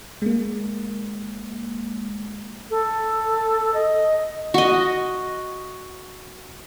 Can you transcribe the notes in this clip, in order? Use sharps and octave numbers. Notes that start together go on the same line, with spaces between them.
G#3 A#3
A4
D#5
F#4 D#5